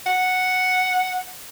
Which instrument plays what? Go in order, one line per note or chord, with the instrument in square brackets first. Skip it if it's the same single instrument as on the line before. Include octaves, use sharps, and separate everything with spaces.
[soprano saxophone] F#5